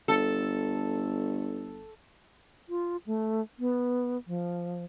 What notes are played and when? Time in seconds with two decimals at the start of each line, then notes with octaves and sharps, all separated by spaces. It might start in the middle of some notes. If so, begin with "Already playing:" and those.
0.08 G1 A4
2.69 F4
3.06 A3
3.59 B3
4.27 F3